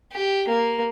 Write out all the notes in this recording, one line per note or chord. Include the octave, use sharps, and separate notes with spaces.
G4
A#3